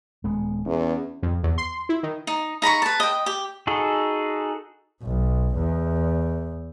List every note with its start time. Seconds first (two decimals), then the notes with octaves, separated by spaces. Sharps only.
0.24 D#1 G#3 B3
0.66 E2 C#4
1.23 F2
1.43 E2
1.58 C6
1.89 E4
2.03 D#3
2.27 D#4
2.62 D#4 A#5 B5 C#6
2.82 B4 A5
3.00 D#5 G5
3.26 G4
3.67 D#4 F#4 G#4 A4
5.03 B1
5.55 E2